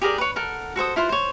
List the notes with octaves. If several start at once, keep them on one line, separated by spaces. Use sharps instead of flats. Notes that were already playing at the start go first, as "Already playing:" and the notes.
G4 G#4 A#4 D5
B4 C#5
A4 A#4 F#5
F#4 A4 C5 D#6
E4 F4 B4 C5
C5 C#5